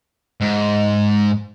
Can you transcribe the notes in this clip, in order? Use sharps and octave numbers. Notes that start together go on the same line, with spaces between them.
G#2